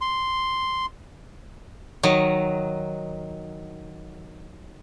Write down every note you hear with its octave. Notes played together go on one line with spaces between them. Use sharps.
C6
D#3 F#3 D#5